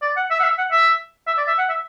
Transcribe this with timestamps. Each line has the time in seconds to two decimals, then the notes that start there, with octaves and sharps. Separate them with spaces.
0.02 D5
0.16 F#5
0.30 E5
0.40 F#5
0.44 E5
0.58 F#5
0.71 E5
1.27 E5
1.37 D5
1.48 E5
1.58 F#5
1.69 E5